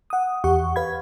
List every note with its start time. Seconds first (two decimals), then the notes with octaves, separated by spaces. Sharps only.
0.10 F#5 D#6
0.44 E2 G4 F#5 C#6
0.76 B4 F5 B5 G#6